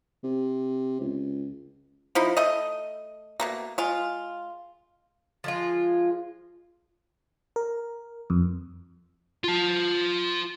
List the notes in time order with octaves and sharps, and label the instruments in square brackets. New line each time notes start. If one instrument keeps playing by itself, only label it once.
[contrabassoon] C3
C#2
[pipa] F3 D#4 E4
A3 D#5
B2 A3 A#3
G#3 F4
[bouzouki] F3 G#3 F4
[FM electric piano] A#4
F2
[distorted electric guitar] F4 A5